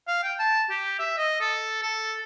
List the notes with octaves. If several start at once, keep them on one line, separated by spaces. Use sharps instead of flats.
F5
G5
A5
G4
E5
D#5
A4
A4